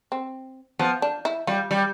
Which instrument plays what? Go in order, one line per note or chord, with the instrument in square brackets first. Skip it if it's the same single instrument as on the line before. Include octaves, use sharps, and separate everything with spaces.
[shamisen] C4
[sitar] F3 [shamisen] B3
[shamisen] D4
E4
[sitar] G3 [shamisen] F4
[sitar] G3